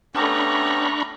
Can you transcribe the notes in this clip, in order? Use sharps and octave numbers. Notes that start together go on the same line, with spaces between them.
A3 B3 C#4 D4 G4 A#5 B5 C#6